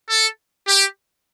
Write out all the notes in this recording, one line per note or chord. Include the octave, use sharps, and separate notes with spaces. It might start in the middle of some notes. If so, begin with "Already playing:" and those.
A4
G4